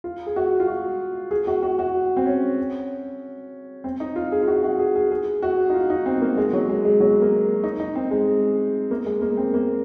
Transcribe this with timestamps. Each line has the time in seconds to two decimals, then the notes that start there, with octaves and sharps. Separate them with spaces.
0.04 F4
0.26 G#4
0.36 F#4
0.60 F4
0.67 F#4
1.31 G#4
1.47 F#4
1.63 F#4
1.79 F#4
2.17 C4
2.26 C#4
3.84 C4
4.00 D#4
4.16 F4
4.32 G#4
4.42 F4
4.47 F#4
4.63 F#4
4.79 G#4
4.95 G#4
5.11 G#4
5.43 F#4
5.70 D#4
5.74 F4
5.90 D#4
6.06 C4
6.22 A#3
6.37 G#3
6.53 F#3
6.69 G#3
6.85 G#3
7.00 F#3
7.22 A#3
7.64 D#4
7.80 D#4
7.95 C4
8.11 G#3
8.91 A#3
9.06 G#3
9.22 A#3
9.37 C4
9.54 A#3